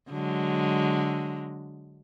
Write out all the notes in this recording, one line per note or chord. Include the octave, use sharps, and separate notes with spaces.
D3 F#3 G#3